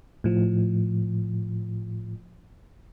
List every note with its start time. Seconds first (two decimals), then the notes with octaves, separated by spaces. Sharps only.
0.24 A2 F3